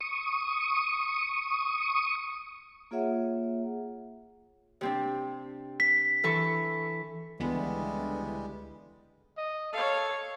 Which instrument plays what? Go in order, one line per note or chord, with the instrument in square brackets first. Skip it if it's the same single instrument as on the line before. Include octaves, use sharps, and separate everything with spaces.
[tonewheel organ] C#6 D#6
[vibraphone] A#3 F4 G#4 C#5 E5 F#5
[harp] C3 C4 D4
[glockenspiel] B6
[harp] E3 A4 C#6
[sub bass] C#2 [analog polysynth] D3 E3 B3 [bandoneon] G3 G#3
[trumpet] D#5
[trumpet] A4 [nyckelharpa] C#5 F5